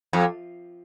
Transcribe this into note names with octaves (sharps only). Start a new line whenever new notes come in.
F2